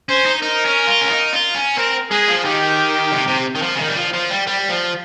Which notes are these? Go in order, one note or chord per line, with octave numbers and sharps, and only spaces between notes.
C#4 C5
D#4
D#4 A#4
C#4
F4
C#4
D#4
F4
C#4
C4 A#4
G#3 G#4
F3
D#3 G4
C3
C3
D#3
F3
C#3
D#3
G3
F3
F3
G3
G3
F3